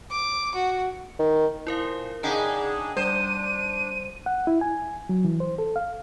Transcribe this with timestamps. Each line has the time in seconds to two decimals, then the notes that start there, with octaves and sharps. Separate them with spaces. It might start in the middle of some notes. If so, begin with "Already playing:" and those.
0.10 D6
0.55 F#4
1.19 D#3
1.67 A#2 E4 A#4 C5 F5
2.23 C#3 D4 D#4 G#4 F#5 G5 A5
2.97 G3 D4 C5 D#7
4.26 F#5
4.47 E4
4.61 G#5
5.09 F#3
5.25 E3
5.40 C5
5.58 A4
5.76 F5